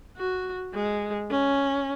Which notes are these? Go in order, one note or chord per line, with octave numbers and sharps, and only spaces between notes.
F#4
G#3
C#4